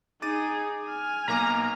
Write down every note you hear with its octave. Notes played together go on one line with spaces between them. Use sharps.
D#4 G#4 D6 A6 D#7
G#5 F6
B1 A#3 A#5 D6